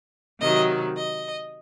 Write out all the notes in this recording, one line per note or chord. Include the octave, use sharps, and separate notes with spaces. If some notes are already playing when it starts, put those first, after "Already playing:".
C3 D#3 F#3 D#5
D#5